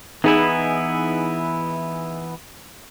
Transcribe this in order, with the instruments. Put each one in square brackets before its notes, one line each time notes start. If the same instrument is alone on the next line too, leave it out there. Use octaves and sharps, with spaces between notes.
[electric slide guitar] E3 B3 E4 [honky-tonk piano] D#4 G#4